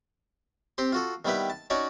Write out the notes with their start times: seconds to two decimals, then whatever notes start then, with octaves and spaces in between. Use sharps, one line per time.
0.78 C4 G4 C6
0.92 F4 F#4 A4
1.25 D#3 G3 B3 E4 G4 B4
1.50 A5
1.70 C#4 D#4 F#4 C#5 D5